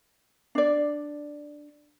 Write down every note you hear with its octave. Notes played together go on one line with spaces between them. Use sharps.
D4 D5